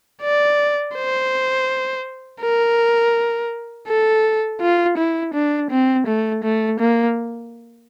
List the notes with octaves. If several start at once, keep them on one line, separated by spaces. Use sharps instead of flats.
D5
C5
A#4
A4
F4
E4
D4
C4
A3
A3
A#3